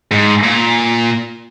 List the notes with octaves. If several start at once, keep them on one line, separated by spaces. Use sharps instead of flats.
G#2
A#2